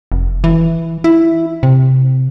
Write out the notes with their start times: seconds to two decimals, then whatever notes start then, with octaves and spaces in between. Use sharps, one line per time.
0.12 F1
0.44 E3
1.04 E4
1.63 C3